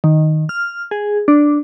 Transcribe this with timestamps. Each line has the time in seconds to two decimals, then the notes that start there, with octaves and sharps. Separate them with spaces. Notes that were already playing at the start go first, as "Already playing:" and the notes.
0.04 D#3
0.49 F6
0.91 G#4
1.28 D4